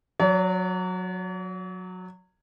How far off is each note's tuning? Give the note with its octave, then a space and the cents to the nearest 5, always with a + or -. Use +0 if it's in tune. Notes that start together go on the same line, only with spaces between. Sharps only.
F#3 -15 C#5 +45